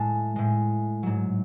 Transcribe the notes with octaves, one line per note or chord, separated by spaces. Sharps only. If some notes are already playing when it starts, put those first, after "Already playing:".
Already playing: A2 G#3 A5
A2 G#3
G#2 F#3